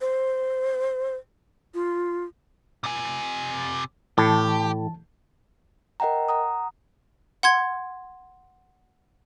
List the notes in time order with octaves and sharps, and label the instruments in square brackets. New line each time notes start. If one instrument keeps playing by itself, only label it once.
[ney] C5
F4
[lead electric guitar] C3 G#5
[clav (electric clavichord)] A2 [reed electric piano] E3 A5 [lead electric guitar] G4
[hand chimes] A#4 D#5 F#5 G5 A#5
F#5 A#5 D#6
[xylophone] F#5 C6 G#6